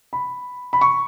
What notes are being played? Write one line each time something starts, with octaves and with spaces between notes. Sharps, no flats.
B5
B5
C#6